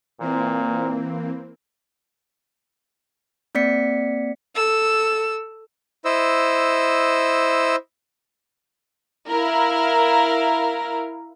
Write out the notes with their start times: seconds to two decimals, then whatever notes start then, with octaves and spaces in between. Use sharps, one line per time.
0.20 A#2 E3 A#3 C4
3.55 A#3 C4 D5 B6 C#7
4.55 A4 E6
6.05 E4 C5 D#5 E6
9.28 E4 A#4 F5